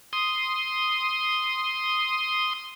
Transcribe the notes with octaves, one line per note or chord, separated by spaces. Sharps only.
C6 D#6